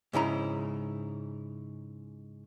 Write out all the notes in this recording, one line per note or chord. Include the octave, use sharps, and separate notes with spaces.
G#2 C#3 E4 A#5